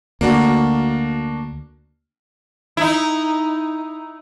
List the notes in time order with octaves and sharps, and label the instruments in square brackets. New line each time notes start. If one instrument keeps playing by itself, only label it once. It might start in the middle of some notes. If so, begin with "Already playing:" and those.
[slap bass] D2 [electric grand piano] A#3 D4 F#4
[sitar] D#4 E4